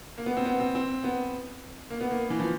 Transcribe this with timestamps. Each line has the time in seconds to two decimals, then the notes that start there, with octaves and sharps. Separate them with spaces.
0.18 A#3
0.26 B3
0.37 C4
0.45 B3
0.60 C4
0.75 C4
1.04 B3
1.90 A#3
2.01 B3
2.11 A#3
2.30 E3
2.40 F3